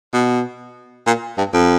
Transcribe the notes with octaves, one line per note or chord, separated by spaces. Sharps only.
B2
A#2
G2
F2